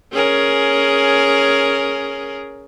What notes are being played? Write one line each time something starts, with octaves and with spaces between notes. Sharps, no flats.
C#4 G#4 A#4